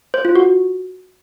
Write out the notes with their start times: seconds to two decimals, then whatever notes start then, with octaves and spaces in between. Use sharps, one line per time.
0.14 C5
0.25 F4
0.36 F#4